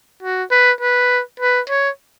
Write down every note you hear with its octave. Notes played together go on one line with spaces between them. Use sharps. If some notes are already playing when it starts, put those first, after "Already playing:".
F#4
B4
B4
B4
C#5